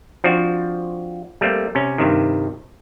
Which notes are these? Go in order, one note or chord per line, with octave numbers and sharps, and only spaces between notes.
F3 C4 D4 F#4
G3 A3 A#3 C4
C3 C#4
G2 C3 D#3